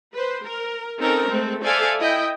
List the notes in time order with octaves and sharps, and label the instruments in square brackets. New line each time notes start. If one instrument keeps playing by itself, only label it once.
[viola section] B4 C5
A#4
C4 C#4 D#4 A4 A#4
G#3 A3 C4 A4
A4 C5 D5 E5 F5 G#5
E4 D#5 G5